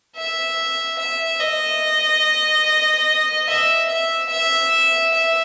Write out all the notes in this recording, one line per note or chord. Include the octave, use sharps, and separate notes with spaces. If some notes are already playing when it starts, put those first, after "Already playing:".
E5
E5
D#5
E5
E5
E5
E5